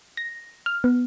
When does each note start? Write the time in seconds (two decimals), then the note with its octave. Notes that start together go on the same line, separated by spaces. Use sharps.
0.17 A#6
0.66 F6
0.84 B3